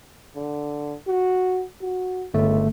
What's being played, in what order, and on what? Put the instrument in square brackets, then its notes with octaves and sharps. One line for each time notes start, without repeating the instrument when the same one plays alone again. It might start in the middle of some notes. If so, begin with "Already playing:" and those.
[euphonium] D3
F#4
F#4
[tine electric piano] G1 A3 [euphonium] C#2